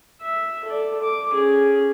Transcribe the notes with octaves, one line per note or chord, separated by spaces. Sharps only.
E5
A4 D5
D6
C#4 G#4